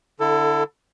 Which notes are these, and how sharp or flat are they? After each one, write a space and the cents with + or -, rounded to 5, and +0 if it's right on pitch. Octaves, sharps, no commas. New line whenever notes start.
D3 -10 E4 +0 A4 +20